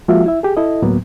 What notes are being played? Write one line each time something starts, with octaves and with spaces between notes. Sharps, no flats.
F3 G#3 A#3 F4 F#4 E5
E4 E5
G4 G#4
E4 A4 D#5
D2 A2 F#3 A#3 B3